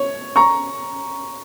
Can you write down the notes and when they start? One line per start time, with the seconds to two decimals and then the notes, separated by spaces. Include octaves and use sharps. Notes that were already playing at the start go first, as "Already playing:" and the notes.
Already playing: C#5
0.36 A#5 C#6